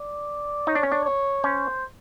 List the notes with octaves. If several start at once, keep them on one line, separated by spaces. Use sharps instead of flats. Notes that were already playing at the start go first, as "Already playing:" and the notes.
Already playing: D5
D#4 C#5
D4
C#4
D4
C#5
C#4 C5